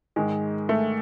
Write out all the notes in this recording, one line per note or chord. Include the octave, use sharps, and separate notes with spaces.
G#2 D#3 G#3
A3